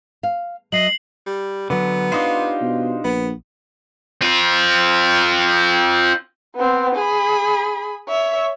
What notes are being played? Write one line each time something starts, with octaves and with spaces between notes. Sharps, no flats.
F5
F#3 D#5 E5 C7 F#7
G3
D3 F#3 B3
D4 D#4 F4 G4 C5
B2
A#1 B3
C4 F4
B3 C4
G#4 B5
C#5 E5